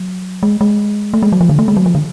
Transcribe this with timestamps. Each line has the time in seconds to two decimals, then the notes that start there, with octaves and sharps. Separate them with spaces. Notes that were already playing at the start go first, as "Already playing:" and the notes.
Already playing: F#3
0.43 G#3
0.61 G#3
1.14 A3
1.23 G#3
1.32 F#3
1.41 F3
1.49 D3
1.59 A3
1.68 G#3
1.77 F#3
1.86 F3
1.95 D3